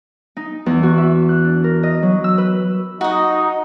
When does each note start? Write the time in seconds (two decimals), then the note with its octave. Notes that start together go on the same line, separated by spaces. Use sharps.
0.37 D#4
0.66 E2
0.83 F#4
0.98 E5
1.29 F#6
1.44 D4
1.64 A#4
1.83 D#5
2.02 F#3
2.24 E6
2.38 B4
3.01 D#4 F#4 D#5